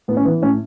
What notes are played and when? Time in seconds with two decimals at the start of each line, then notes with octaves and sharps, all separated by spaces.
0.08 A2 B3
0.17 C#4
0.25 E3 B3
0.42 A2 C#4